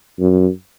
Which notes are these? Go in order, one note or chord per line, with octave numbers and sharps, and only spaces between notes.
F#2